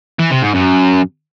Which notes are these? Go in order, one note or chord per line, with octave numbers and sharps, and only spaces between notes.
E3
C3
G#2
F#2